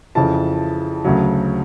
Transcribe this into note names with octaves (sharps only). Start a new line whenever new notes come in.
F2 C#3 E3 A5
D2 C#3 F#3